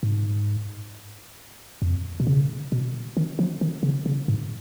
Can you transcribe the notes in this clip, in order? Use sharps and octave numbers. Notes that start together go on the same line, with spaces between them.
G#2
F2
B2
C#3
B2
D#3
F3
D#3
C#3
C#3
G#2